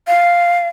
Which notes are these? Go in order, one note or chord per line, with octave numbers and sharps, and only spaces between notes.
F5